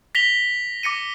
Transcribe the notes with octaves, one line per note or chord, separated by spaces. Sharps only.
A#6 B6 F7 G7
D6 A#6 C#7 D#7